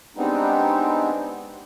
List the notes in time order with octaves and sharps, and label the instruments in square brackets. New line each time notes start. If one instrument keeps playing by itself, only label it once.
[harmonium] G3 G#3 B3 C4 D4 D#4